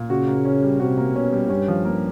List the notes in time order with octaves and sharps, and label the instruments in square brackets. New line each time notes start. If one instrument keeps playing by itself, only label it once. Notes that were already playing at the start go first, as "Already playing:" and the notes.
Already playing: [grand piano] A#2
[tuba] C#3 [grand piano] F#4
[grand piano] A#3
C#4
G3
[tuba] C3 [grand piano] F#4
[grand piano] A#3
[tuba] B2 [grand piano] C#4
[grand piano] G3
[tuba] G2 [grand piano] C#4
[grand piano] F3
A#3